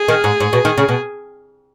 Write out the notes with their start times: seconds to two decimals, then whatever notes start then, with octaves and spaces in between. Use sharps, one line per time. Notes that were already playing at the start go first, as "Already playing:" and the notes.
Already playing: G#4
0.08 D#3
0.24 G#2
0.40 G#2
0.53 B2
0.65 D#3
0.78 C#3
0.89 B2